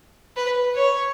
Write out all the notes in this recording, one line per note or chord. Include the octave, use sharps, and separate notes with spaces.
B4
C#5